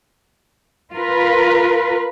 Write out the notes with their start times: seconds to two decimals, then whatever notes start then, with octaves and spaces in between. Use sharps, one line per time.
0.94 F4 A#4 B4